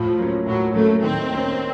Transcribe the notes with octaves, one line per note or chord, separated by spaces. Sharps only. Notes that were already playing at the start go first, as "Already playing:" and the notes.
Already playing: A2 F3
F#3 A#3 C#4
A2 F#3
F#3 A3 A#3 C#4
D#3 C4
A#3 C#4